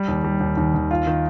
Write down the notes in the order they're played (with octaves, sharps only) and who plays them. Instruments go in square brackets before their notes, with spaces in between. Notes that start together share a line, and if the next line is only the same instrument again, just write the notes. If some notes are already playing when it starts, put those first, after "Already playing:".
Already playing: [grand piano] G3
D#2
G3
D#2
D#2
D#2
F4
D#3